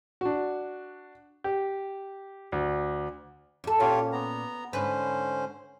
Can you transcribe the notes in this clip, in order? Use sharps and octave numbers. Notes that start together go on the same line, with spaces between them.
D4 F#4
G4
D2
E2 A4
A#2 C#4 F4 G4 C#5
B3 A#5
G#2 D3 C#4 B4 C5